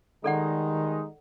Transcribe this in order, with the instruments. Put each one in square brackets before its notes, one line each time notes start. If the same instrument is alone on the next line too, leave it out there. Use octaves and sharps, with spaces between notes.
[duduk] D#3 [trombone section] G3 G#3 D#4 [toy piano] A4 D5 F#5